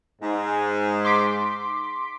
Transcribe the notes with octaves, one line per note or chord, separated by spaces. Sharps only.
G#2
C6 D6 B6